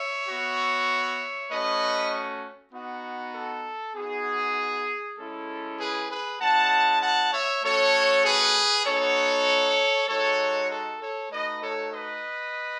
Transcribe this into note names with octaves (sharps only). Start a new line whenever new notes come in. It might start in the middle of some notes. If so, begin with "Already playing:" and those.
Already playing: C#5 E5
B3 F#4
A3 C#4 F#4 B4 D#5
B3 D#4 F#4
A4
B3 D#4 F#4 G#4
G#3 C#4 E4 A4
G#4 B4
G#4 B4
G#3 C#4 E4 F#5 A5
F#5 A5
C#5 E5
A3 C#4 F#4 A4 C#5
G#4 B4
B3 D#4 F#4 A4 C#5
G#3 D#4 F#4 A4 C#5
A4
A4 C#5
A3 D#4 F#4 B4 D#5
A4 C#5
B4 D#5